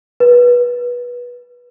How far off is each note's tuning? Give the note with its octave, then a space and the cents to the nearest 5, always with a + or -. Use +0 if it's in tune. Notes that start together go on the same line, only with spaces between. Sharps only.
B4 -20